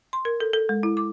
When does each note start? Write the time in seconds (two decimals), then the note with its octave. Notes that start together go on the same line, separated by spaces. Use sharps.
0.13 C6
0.25 A#4
0.40 A4
0.53 A4
0.69 G#3
0.83 E4
0.97 D6